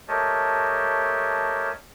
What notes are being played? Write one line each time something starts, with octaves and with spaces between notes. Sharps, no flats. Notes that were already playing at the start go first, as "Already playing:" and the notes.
A3 G4 A#4 C#5 D#5 A5